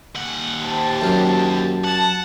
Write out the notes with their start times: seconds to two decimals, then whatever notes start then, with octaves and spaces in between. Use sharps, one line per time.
0.16 D#2 F#5
0.63 G4 C5 A5
1.02 F#2 C#4
1.84 F#5 A5